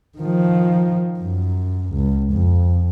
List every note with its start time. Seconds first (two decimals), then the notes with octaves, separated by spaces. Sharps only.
0.18 D#3 F3
1.19 F#2
1.94 C#2
2.32 F2